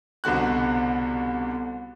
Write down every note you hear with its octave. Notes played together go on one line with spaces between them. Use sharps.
C2 B2 D3 F#4 F#6